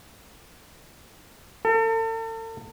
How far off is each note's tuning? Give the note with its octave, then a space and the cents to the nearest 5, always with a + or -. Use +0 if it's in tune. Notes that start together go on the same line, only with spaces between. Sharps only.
A4 +40